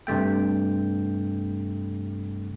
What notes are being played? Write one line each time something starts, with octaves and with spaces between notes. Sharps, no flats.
G2 C3 A3 G5